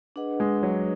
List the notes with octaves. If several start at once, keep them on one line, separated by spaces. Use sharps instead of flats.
D4 G#4 B4 D#5 F#5
G#3
F#3